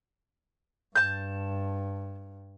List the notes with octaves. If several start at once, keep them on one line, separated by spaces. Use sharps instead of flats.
G2 A5 G6